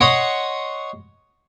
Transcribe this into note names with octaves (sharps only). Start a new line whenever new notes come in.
C#5 D#5 F#5 C6